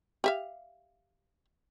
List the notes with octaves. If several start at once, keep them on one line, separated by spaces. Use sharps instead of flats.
G4 E5 F5